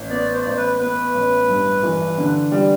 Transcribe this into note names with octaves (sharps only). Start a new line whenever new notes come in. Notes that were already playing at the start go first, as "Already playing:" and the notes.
Already playing: A1
B3 D5
C5
D5
A1 C5
B4
B3 B4
A1
G2
E3
D3
G3